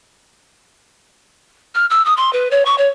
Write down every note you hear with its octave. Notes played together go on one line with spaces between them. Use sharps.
F6
E6
D#6
C6
B4
C#5
C#6
C#5